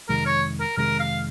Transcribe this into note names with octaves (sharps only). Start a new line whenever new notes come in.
F2 C3 D#3 G#3 A#4
C#5
A#4
F2 C3 D#3 G#3 A#4
F5